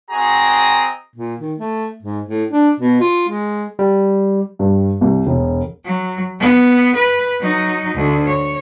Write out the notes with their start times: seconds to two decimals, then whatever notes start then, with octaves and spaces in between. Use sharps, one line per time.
0.11 C4 F#4 G#4 D#5 A#5
1.16 A#2
1.40 D#3
1.59 A3
2.02 G#2
2.27 A2
2.51 D4
2.80 B2
3.01 F4
3.28 G#3
3.79 G3
4.59 G2
5.01 C2
5.27 E1
5.85 F#3
6.40 B3
6.95 B4
7.40 F#3 D#4
7.94 D2
8.26 C#5